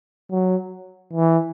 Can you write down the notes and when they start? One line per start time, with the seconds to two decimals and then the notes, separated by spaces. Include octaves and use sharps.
0.31 F#3
1.13 E3